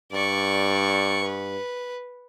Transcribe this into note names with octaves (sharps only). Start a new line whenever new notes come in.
G2 D5 C#6
B4